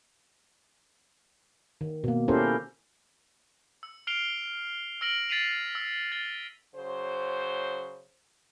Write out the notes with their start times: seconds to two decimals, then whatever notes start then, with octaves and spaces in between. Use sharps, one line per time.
1.81 D#3
2.04 B2 A#3
2.28 C#4 E4 G4 A4 A#4 C5
3.83 E6
4.07 F6 C7 D7 F7 G7
5.01 E6 F6 A#6 D7 F#7
5.29 A6 B6 C7 D#7 F7 F#7
5.75 E6
6.12 A6 G7
6.75 C#3 F#3 C5